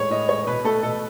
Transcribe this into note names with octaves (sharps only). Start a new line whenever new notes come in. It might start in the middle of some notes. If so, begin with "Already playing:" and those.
Already playing: A2 G#3 C#5
A2 D#5
G#3 C#5
B2 B4
A3 A4
B2 A4